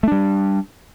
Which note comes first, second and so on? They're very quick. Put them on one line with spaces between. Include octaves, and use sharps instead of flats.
A3 D4 G3